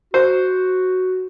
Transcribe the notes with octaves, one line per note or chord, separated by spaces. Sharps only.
F#4 C5